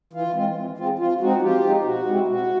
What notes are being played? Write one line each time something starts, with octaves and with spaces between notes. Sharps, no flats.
E3 F4
G#3 C4 F4
E3
G#3 C4 F4
F3 F4
G#3 C4 D#4 F#4
F3 F4 G4
G#3 C4 D#4
B2 F#4
G#3 C4 E4
B2 F#4